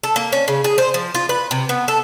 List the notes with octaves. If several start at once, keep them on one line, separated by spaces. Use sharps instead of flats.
A4
A#3
C#4
C#3
G#4
C5
F3
F4
B4
C3
B3
A4